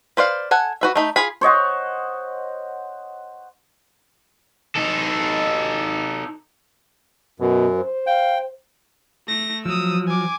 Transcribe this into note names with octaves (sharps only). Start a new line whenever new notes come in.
B4 C5 D5 F5
A4 F#5 G#5
F#4 B4 E5
A3 D#4 B5
F4 G#4 B5
C5 C#5 D#5 F#5
D#4 A4
F#2 B2
C5
F5 G5
A3 A#6
F3 F#3 D#6 E6
G#5 D6